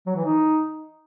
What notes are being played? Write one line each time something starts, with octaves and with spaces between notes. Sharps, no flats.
F#3
E3
D#4